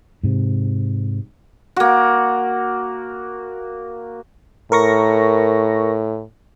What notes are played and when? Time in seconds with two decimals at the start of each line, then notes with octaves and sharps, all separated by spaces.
0.23 G#2 C3
1.76 A#3 F#4
4.72 A2 A#4 C#6 A#6